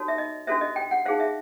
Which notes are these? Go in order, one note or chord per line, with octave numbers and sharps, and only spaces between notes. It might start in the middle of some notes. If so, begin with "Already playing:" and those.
Already playing: D#4 F#4 A4 C#5
E5
D#5
D4 F#4 A4 C5 E5
D#5
G5
F#5
D#4 G#4 C5 F5
E5